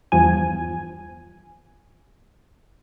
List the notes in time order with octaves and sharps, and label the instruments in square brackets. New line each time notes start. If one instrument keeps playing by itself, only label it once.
[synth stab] E2 G2 F3 G#5